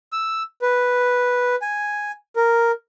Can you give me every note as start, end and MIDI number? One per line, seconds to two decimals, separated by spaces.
0.13 0.43 88
0.62 1.55 71
1.62 2.11 80
2.36 2.71 70